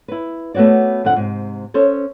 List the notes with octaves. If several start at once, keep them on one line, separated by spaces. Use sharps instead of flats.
E4 B4
A3 B3 F#4 C#5 D5
F2 D3 F#5
G#2 C3
C#4 A4 C5 C#5